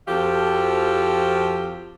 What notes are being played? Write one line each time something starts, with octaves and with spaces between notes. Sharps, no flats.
F2 F3 F#4 G4 A4 F5